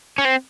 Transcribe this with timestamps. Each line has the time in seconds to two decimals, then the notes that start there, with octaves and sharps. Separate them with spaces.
0.18 C#4
0.25 C4